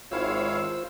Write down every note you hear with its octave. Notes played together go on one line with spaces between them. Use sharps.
G#1 E4 F4 C5 C#5 F5 E6